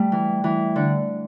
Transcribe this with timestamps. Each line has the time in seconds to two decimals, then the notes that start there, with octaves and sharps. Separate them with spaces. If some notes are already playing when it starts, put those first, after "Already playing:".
Already playing: G3 A3
0.12 E3
0.44 E3
0.76 D3